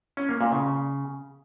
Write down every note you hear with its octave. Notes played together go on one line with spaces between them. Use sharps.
C#4
A#3
A#2
C#3